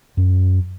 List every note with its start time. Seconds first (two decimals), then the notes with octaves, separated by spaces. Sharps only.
0.17 F#2